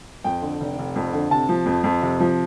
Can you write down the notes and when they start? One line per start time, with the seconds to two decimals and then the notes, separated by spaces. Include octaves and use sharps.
0.24 F2 G5
0.42 D3
0.60 F1
0.79 F1
0.96 F2
1.13 D3
1.31 C3 A5
1.49 F3
1.66 F2
1.84 F2
2.02 C3
2.20 F3